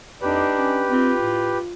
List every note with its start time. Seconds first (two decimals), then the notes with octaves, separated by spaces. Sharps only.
0.22 F2 D4 D#4 G4 B4
0.58 C#4
0.89 C4 F4
1.20 A2